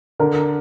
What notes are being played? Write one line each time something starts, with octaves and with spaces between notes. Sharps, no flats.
D3 A#4